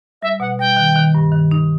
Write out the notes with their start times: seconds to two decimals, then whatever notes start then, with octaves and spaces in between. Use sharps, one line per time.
0.22 G3 E5
0.40 B2 F#5
0.59 G3 G5
0.77 D#3
0.96 D#3
1.15 G2
1.32 D#3
1.51 D#4